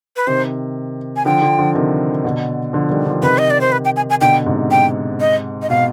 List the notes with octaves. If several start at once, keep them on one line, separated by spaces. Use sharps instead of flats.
B4
C3 D#3 C5
G#5
D3 F3 G5
D3 F3
D3 F3
C3 D#3
B2 D3
D3 F3
D#3 G3
D3 F3
C3 D#3 B4
D#5
D5
C5
B4
G5
G#5
G#5
B2 D3 G5
G#2 C3
G5
D#5
D#5
B2 F5